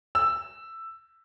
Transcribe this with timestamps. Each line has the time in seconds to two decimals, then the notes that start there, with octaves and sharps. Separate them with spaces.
0.15 E6